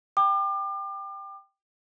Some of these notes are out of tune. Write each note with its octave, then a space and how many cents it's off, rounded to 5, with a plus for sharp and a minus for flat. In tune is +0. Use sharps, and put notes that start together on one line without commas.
G5 +0 D6 +35